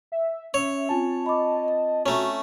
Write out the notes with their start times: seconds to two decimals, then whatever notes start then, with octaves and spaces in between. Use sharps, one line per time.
0.12 E5
0.54 C#4 C#5 E5
0.89 C4 F4 G#5 A5
1.26 D#5 B5 D6
2.06 A3 C#4 F#4 A#5